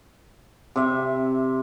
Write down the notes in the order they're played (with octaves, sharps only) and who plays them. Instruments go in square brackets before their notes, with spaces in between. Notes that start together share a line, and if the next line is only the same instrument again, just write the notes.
[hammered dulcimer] C3 E5